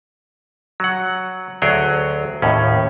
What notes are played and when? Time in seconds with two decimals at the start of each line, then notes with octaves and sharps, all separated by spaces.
0.80 F#3 F#5
1.62 D2 F#3 G#4 C#5 G5
2.42 D#2 A2 C#4